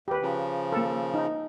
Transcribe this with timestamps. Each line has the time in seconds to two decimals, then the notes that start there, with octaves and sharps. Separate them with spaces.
0.08 D#2 G4 B4
0.22 C#3 F3
0.72 A#3 A4
1.14 D#4